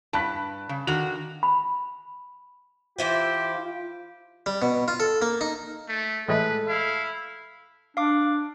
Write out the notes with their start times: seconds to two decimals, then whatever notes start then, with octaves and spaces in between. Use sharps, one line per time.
0.13 G2 A5 F#6 B6
0.69 C#3
0.87 D3 D#3 F#4 F7
1.43 B5
2.98 E3 E4 F4 G4 C5
4.46 G3
4.62 B2
4.88 F4
5.00 A4
5.22 A#3
5.41 D#4
5.89 A3
6.28 A2 E3 G#3 A4 B4
6.68 E4 F5
7.97 D4 F5 D6